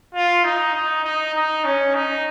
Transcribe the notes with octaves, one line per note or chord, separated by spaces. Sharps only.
F4
D#4
D#4
D#4
D#4
C#4
D#4